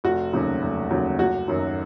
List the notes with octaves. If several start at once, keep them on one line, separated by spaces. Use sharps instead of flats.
F1 F#4
D#2 C#3 F#3
F1
D#2 C#3 F#3
F#1 F#4
F#2 D#3 F#3